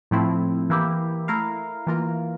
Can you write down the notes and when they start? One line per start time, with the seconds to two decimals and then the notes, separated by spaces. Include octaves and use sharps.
0.11 A2 F3 A3 C4 E4
0.70 E3 A#3 E4 G4
1.28 A3 E4 A#4 F5
1.87 E3 A#3 F4 A#4